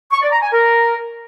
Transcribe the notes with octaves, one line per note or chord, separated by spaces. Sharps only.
C#6
D5
A#5
G#5
A#4